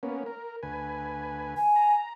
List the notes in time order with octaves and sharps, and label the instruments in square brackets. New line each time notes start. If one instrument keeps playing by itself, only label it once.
[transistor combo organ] A#3 B3 C#4
A#4
D2 B4 G#5
[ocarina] G#5
[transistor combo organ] A#5